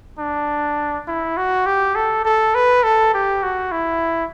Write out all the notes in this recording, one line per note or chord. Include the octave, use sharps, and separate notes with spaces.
D4
E4
F#4
G4
A4
A4
B4
A4
G4
F#4
E4